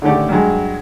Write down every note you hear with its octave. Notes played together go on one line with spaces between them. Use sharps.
D3 D#3 A3 C#4 G4 D5
G2 F#3 G#3